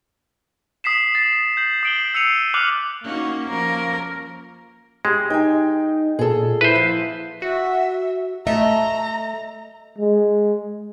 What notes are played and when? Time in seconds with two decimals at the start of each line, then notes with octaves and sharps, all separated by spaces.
0.84 D#6 B6 C7 E7
1.14 D#6 A6 C7
1.57 G6 C7 F#7
1.83 D#6 C7 D7 F#7 G7
2.14 E6 C7 C#7 D#7 F7
2.54 D6 F6 F#6 C#7 F7 F#7
3.04 A#3 C#4 D#4 F#4
3.50 F3 C#4 A#4
5.05 G#3 G4
5.30 D#4 G5 G#5
6.19 A#2 G#4 A4
6.61 E4 B4 C5
6.75 F3
7.42 F#4 E5
8.47 A3 D#5 E5 A#5
9.99 G#3